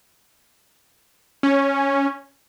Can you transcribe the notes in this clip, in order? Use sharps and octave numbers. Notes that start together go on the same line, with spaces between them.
C#4